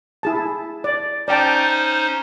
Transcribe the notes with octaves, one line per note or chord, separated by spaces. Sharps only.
E4 G#4 A5
D5
C#4 D#4 C5 D5 G5 A5